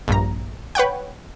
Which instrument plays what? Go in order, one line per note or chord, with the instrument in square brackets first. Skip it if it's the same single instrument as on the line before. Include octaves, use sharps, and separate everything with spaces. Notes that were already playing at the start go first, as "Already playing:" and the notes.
[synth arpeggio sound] A#1 G2 A#5
B4 C#5 F#5 G5